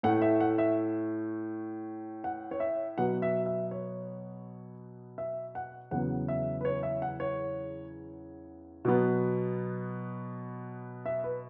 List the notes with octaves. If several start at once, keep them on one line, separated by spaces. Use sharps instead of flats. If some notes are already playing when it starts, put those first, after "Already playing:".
A2 A3 F#5
E5
F#5
E5
F#5
C#5
E5
B2 F#3 B3 F#5
E5
E5
C#5
E5
F#5
E2 C#3 F#3 B3 F#5
E5
B4
C#5
E5
F#5
C#5
B2 F#3 B3
E5
B4